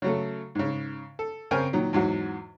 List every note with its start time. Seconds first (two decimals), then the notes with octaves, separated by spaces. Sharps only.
0.02 C#3 F#3 A3
0.55 G#2 C#3
1.19 A4
1.51 C#3 C4 A#4 G5 G#5 F6
1.73 A#2 D#3 F#3
1.93 E2 G#2 F#3 F#4